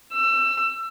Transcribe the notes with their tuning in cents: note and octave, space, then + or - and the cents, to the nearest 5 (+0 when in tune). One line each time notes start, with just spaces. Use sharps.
E6 +25